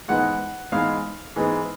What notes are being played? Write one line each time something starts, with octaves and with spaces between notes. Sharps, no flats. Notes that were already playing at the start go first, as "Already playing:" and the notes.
G#2 E3 G#3 B3 D#4 F#5
G#2 E3 G#3 B3 D#4 F5
G#2 E3 G#3 B3 D#4